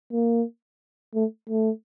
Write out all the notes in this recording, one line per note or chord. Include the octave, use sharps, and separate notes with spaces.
A#3
A3
A3